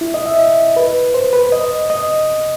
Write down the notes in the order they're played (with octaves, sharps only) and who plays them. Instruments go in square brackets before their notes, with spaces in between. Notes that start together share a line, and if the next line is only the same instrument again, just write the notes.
[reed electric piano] E4
D#5
E5
B4
C5
B4
D#5
D#5